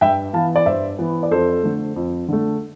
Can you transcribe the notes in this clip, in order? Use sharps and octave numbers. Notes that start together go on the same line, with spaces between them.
G2 E5 G5
E3 B3 F5 A5
D5
G2 C5 E5
E3 B3
D5
F2 A4 C5
D3 A3
F2
D3 A3